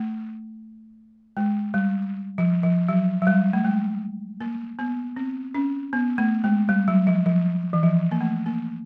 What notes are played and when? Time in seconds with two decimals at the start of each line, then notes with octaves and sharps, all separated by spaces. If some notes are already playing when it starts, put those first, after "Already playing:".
Already playing: A3
1.37 G#3
1.74 G3
2.38 F3
2.63 F3
2.89 F#3
3.22 F#3
3.27 G3
3.53 A3
3.65 G#3
4.41 A#3
4.79 B3
5.16 C4
5.55 C#4
5.93 B3
6.18 A3
6.44 G#3
6.69 G3
6.88 F#3
7.07 F3
7.26 F3
7.73 E3
7.83 F3
8.11 A#3
8.21 A3
8.46 A#3